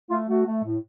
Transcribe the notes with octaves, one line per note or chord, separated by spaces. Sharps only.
A3 F4
A3 F#4
A3
A2